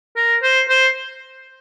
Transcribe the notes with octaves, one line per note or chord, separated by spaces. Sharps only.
A#4
C5
C5